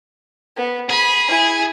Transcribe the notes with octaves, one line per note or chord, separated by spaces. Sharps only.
B3
G#4 B5
E4 G#5